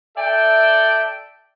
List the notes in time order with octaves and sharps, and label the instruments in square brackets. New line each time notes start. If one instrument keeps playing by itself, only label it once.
[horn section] A4 D5 E5 G5